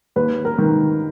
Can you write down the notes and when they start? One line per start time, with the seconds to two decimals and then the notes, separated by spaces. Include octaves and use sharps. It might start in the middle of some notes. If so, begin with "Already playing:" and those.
0.16 D#2 B4
0.45 A#4
0.58 D#3